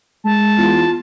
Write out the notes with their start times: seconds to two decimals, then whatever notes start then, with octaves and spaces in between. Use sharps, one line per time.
0.25 G#3 A5
0.58 E2 F4